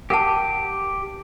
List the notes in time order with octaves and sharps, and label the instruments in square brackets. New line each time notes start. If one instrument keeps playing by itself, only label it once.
[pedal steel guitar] G4 [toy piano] A#4 F#5 A5